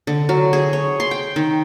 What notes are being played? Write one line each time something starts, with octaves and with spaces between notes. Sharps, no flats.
D3
F#3
G#4
C#5
C6
G5
D#3